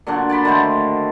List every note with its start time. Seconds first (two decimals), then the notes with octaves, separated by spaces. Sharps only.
0.07 A#2 D3 F#3 D4
0.29 D5 A5 B5 C6
0.45 D3 D#3 A3 C5